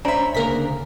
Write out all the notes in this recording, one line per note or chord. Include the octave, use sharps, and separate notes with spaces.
C#4 D4 C5 E5 A#5 B5
D2 C#3 A#3 D4 A#4 B6